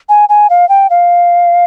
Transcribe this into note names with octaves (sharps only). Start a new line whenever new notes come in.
G#5
G#5
F5
G5
F5